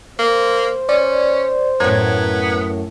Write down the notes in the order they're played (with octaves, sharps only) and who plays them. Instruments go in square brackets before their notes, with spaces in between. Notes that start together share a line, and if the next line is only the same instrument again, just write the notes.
[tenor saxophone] A#3 [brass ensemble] C5
[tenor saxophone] C#4 [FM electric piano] D5
[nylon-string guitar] F#2 A2 [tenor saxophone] B3 [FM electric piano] A#5 G#6